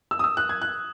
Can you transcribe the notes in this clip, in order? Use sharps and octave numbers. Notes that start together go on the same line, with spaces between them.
E6
D#6
E6
F#6
G#6
F#6